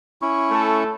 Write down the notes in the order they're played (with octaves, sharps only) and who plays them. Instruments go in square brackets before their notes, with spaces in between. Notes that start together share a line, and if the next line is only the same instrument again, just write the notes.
[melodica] C#4 E4 C#6
[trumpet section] A3 A4